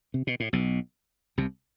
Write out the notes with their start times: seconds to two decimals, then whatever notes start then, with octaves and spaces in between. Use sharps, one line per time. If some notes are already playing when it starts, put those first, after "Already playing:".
0.14 C3
0.27 B2
0.40 A2
0.53 B1 B2
1.37 C2 C3